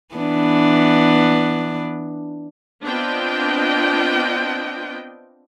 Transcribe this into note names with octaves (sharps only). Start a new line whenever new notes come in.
E3 B3 D4
B3 C4 D4 F4 D#5 G5